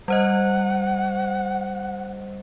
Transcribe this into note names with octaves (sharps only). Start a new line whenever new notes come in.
G3 C5 D#5 F#5